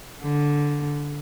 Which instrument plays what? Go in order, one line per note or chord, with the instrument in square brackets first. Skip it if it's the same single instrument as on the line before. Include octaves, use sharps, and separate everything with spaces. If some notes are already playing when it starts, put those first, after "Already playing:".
[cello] D3